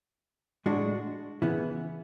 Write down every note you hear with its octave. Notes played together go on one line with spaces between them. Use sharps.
A2 G#3 D4 F#4
C#3 E3 B3 E4